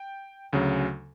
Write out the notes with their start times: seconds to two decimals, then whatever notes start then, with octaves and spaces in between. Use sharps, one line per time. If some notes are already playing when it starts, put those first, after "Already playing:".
Already playing: G5
0.53 D2 C#3 F#3